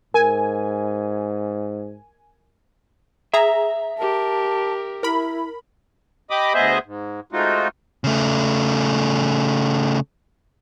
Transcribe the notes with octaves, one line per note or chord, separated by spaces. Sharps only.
G#2 A#4 G#5
G#4 E5 A#5
G4 A#4 A5
E4 A#4 B5
G4 D#5 B5 D6 D#6
D2 B3 G#4 C5 D#5 E5
G#2
G#3 A3 C4 D#4 F4 F#4
C#3 A3